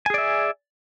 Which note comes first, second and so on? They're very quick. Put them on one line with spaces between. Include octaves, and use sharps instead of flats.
G#5 G#4 D5 E5